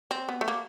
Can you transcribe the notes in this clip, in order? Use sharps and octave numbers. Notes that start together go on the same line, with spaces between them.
C4
B3
A3
A#3